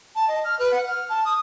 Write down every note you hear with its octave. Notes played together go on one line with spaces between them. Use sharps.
A5
D#5
F6
B4
F#5
F6
A5
D#6